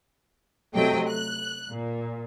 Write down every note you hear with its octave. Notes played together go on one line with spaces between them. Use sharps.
C3 F#3 A3 D#5 G5
F#6
A#2